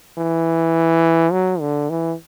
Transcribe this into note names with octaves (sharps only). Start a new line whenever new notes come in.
E3
F#3
D3
E3